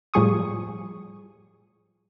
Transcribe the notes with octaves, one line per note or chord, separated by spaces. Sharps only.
A2 F3 G3 G#4 C#6 D#6